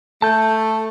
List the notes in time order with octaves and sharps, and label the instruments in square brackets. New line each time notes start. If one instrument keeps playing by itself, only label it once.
[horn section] A3 [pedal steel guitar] A5 G6